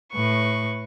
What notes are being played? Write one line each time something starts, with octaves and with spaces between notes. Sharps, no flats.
A2 B4 C#6